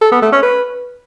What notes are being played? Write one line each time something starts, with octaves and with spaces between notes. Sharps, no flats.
A4
B3
A3
C#4
B4